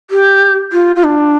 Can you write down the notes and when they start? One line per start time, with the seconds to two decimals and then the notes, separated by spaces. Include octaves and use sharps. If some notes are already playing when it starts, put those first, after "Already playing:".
0.11 G4
0.73 F4
0.96 F4
1.04 D4